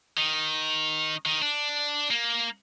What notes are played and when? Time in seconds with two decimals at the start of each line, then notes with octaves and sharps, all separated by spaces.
0.17 D#3
1.26 D#3
1.42 D4
2.11 A#3